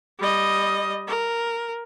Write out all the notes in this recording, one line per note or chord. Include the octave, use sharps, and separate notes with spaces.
G3 D#5
A#4